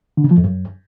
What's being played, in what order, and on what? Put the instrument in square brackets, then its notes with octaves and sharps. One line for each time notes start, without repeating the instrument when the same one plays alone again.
[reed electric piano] D3
C#3
F3
F2
F#2